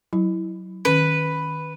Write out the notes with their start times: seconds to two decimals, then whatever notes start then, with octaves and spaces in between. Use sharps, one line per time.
0.13 F#3 E4
0.85 D#3 C#4 B4